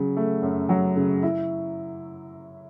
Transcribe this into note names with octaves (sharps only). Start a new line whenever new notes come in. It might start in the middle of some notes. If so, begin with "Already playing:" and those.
Already playing: C#3 F#3
A3
F#2
F#3
C#3
E4